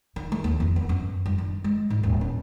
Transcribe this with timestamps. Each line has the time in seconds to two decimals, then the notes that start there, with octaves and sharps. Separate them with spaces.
0.16 D#3
0.32 A3
0.44 D#2
0.60 F2
0.76 B3
0.89 F#2
1.26 G2
1.38 D#3
1.64 G#3
1.90 G#2
2.03 D#1
2.21 C#4